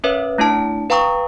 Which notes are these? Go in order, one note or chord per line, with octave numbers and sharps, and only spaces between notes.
C#4 A#4 B4 C#5 E5
A3 D4 E4 A5 D7
B4 F5 G5 A#5 C#6 D#6